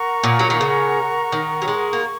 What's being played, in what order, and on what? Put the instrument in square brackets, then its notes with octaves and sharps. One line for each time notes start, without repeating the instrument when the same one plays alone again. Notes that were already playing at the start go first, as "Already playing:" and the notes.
Already playing: [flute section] A#4 F#5 A#5 C#6
[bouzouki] A#2
F#3
D#3
C#3
D#3
F#3
G#3
A#3
[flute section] C#6